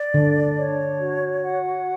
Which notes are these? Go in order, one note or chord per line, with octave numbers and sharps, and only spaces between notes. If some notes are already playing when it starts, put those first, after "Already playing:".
Already playing: D5
D3 D4
C#5
F#4
F#5